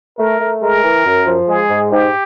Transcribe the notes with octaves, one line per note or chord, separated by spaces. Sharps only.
A3 A#4
A3
G#3 A#4
E3
F#2
F3
G#3 G#4
G#2
G#2 G4